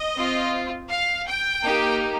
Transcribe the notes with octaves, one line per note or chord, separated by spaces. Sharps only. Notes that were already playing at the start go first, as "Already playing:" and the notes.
Already playing: D#5
C4 F4
F5
G5
A#3 D#4 G4